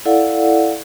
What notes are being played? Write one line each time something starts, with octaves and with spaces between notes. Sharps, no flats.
E4 A4 D5 F5 F#5